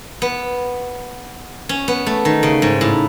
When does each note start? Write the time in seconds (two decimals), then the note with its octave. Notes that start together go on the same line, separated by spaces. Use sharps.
0.22 B3
1.69 C#4
1.88 B3
2.06 A3
2.25 D#3
2.43 C#3
2.62 G#2
2.81 A2